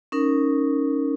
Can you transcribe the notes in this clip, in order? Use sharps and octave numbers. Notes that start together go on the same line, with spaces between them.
C#4 D#4 A#4